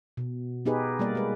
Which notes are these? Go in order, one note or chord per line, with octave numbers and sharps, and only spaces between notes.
B2
B3 D#4 G4 G#4 B4
G3 A#3 A#4 D5
G#3 B4